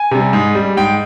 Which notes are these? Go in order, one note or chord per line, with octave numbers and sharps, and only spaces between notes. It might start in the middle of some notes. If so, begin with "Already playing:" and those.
Already playing: G#5
C3 G3
G#2
G3
G#2 G5